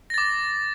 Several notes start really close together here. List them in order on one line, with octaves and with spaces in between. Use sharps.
A#6 A6 D6